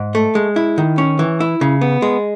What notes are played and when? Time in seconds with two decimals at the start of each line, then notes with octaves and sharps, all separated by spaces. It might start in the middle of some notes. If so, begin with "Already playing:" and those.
Already playing: G#2
0.15 A3
0.35 G#3
0.56 E4
0.78 D#3
0.98 C#4
1.19 E3
1.40 E4
1.61 C#3
1.81 B3
2.02 G#3